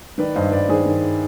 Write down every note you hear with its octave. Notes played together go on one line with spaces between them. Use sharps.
D#3 B4 D5
G2 C5 D#5
G2 B4 D5
D#3 G#4 C5
D#3